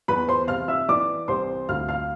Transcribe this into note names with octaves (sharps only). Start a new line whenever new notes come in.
E2 B4 B5
C5 C6
C3 F5 F6
E5 E6
E3 D5 D6
C2 C5 C6
D2 F5 F6
F5 F6